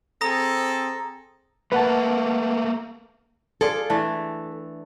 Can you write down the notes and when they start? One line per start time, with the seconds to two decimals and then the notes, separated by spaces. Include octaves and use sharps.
0.21 C4 G#4 A4 A#5 D#6 A#6
1.72 A3 A#3 B4 F#5 A5
3.61 F4 G#4 A4 D5
3.90 E3 A3 D4